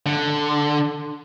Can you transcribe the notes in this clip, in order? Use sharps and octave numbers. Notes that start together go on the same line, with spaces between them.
D3